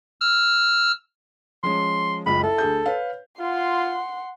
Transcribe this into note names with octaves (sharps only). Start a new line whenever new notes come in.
E6 F6
F3 G#3 C#4 C6
F#1 C#2 F4 B5
E4 A4
D2 G#4 G6
B4 C#5 F5
F4 F#5 C6